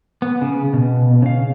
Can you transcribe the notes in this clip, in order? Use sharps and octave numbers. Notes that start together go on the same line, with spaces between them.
B3
C#3
B2
C#3 F5